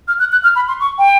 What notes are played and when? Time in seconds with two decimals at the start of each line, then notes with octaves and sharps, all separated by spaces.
0.08 F6
0.19 F#6
0.32 F#6
0.43 F6
0.56 B5
0.68 C6
0.80 C#6
0.98 G5